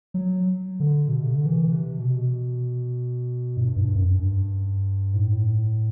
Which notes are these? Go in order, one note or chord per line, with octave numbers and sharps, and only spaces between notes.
F#3
D3
B2
C3
D3
E3
C3
B2
G2
G2
F#2
G2
A2